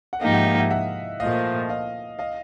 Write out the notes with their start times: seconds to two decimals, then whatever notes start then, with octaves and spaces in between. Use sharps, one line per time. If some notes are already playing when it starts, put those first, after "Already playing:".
0.13 F#5
0.21 G#2 F3 A#3 D#4 G4 D#5 F5
0.34 E5 F#5
0.45 D#5 F5
0.58 E5 F#5
0.70 E5 F#5
1.20 A#2 F3 A3 D#5 F5
1.69 D#5 F5
2.19 D#5 F5